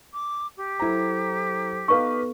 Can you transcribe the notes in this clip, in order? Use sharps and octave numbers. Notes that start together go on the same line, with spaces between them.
D6
G4
F#3 E4 A4 C5 A#5
B3 D#4 A4 B4 F5 C#6